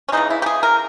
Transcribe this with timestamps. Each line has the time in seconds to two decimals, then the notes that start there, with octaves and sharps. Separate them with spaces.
0.09 C#4
0.12 C#3 E3 G#3 D#4
0.30 E4
0.42 G4
0.46 G#4
0.63 A#4